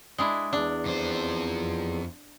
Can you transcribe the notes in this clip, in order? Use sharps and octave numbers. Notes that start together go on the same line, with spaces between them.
G#3 D4 E4
E2 D4
F2 C5